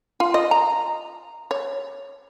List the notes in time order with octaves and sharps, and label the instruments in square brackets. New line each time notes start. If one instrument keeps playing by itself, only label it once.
[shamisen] F4
D#5
A#5
C#5